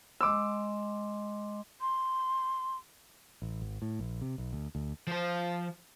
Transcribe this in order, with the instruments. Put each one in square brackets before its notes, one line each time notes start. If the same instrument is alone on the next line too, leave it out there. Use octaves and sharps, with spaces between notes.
[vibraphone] G#3 D#5 C6 [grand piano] D6 E6
[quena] C6
[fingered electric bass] A1
G#1
A2
A#1
C3
B1
D2
D2
[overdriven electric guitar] F3 C5